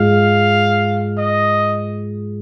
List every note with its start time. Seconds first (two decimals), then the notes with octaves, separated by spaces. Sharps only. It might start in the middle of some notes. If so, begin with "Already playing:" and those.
Already playing: G#2 G#3 F4 G#4 F5
1.18 D#5